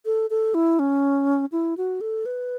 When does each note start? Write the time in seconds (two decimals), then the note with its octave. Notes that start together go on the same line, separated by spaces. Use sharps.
0.05 A4
0.30 A4
0.54 E4
0.79 C#4
1.52 E4
1.77 F#4
2.01 A4
2.26 B4